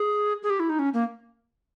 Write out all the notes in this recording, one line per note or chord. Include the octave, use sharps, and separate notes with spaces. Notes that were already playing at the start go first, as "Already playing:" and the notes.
Already playing: G#4
G#4
G4
E4
D#4
C#4
A#3